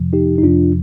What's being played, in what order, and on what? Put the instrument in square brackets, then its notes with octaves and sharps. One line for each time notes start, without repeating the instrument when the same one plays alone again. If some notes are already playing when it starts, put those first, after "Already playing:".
Already playing: [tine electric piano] F2 C3 F3
D#4 G4
D#4
F2 C3 F3 D4 F4